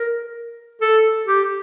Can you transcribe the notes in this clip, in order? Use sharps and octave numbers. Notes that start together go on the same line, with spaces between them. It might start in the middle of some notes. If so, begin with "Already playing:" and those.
Already playing: A#4
A4
G4